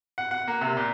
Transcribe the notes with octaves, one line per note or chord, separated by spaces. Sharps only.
F#5
F#5
A#3
C3
A#2